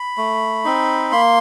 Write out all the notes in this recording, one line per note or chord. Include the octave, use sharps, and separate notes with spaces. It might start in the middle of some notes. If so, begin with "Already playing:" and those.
Already playing: B5
A3
C4 D#4
A#3 C6